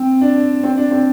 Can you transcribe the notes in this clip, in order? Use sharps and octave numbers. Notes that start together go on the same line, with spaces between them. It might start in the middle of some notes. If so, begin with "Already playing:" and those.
Already playing: C4
D4
C4
D4
C4